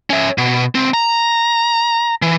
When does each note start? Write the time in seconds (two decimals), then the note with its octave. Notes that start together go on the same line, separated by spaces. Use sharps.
0.10 C#4 E5
0.38 B2
0.75 C#2 C4
0.94 A#5
2.22 E3